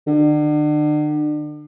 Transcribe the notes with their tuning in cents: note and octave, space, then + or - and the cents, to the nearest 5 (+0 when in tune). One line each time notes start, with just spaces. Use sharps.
D3 +35